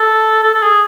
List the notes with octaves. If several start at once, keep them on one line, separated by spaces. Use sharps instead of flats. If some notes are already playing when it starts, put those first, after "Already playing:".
Already playing: A4
A4
A4
G#4